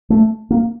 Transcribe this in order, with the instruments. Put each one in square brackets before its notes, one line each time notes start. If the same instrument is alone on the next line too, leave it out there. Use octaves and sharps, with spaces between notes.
[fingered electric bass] A3
A#3